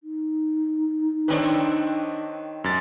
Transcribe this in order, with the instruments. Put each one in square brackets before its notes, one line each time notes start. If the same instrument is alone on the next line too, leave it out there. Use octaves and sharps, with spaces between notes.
[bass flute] D#4
[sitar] D#3 C4 C#5 [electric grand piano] D4 B4
[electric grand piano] F#2 A6